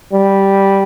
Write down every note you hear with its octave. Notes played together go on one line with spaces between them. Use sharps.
G3